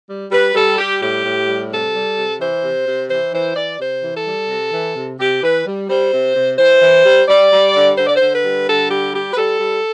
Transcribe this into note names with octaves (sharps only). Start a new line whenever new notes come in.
G3
G3 B4
G3 A4
G3 G4
A2 G4
A2
G3
C3 A4
G3
C3
E3 C5
C3
C3
E3 C5
E3 C5
E3 D5
C3 C5
E3
A4
G3
C3
E3
C3
C3 G4
E3 B4
G3
G3 C5
C3
C3
E3 C5
E3
G3
G3 D5
G3
D3
D3 C5
D5
C5
D3
B4
G3
D3 A4
G3 G4
G3 G4
B4
G3 A4
G3